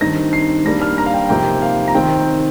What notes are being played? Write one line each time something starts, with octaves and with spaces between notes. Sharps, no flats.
G2 D#3 C4 D#4 A#6
C7
G2 G3 A#3 A#6
F6
A#5
F5
G5
C3 F3 A#3 D#4 G5
F5
A#5
D#3 C4 G5